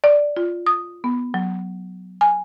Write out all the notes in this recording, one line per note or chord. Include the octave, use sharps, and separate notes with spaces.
D5
F4
D#6
B3
F#3
G#5